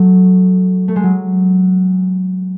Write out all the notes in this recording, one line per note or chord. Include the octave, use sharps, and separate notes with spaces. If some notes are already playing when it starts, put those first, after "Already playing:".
Already playing: F#3 A3
A3
G#3
F#3